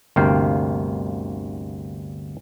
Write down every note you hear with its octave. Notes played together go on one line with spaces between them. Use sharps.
G1 D2 C3 A#3 F5 G5